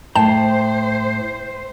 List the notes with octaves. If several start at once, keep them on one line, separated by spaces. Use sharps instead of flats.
A2 C5 G5 A5